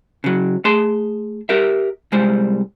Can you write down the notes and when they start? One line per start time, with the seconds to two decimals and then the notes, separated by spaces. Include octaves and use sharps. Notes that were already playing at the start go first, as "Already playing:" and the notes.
0.24 C#3 F#3
0.65 A3 G#4 A5 C6
1.49 G4 A#4 E5
2.12 C2 G3 G#3 C5